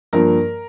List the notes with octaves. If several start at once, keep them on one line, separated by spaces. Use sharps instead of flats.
G2 F3 A#3 A#4